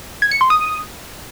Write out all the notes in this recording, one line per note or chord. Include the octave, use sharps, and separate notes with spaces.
G#6
C#7
C6
D#6